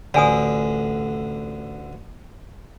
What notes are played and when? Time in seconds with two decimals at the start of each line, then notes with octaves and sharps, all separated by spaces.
0.14 A1 D2 D3 D5 G#5 D#6